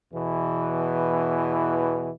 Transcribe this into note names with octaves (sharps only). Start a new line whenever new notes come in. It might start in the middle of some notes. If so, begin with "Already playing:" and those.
E2 B2 E3